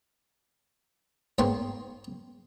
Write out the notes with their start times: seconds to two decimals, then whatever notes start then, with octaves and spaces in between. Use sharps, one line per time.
1.38 G#2 A#3 B3 G5 C6 C#6